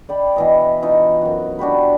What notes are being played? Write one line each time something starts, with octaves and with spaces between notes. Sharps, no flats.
D5 G5 B5
B2 E3 D#5
E3 D#4 F4
F#2 F#4
D4 F#4 G4 B4